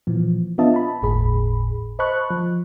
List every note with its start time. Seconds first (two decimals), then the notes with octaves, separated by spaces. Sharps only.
0.07 A#2 E3 F3
0.58 B3 D4 F4 D#5 E5 A5
0.74 A5 B5
1.02 G1 D#2 A2 G#4 B5
1.99 C5 D#5 A5 B5 C#6 F#6
2.30 F3